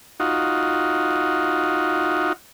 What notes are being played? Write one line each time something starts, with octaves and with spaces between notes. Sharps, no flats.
D#4 F4 F#4